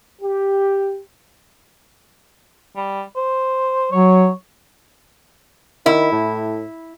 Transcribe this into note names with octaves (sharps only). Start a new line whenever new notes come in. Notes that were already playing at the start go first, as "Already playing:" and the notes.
G4
G3
C5
F#3 C#5
D#3 E4
A2